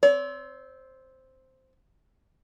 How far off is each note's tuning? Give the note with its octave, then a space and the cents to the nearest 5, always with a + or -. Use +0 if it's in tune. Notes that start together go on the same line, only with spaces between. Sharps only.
C4 +0 C#5 +45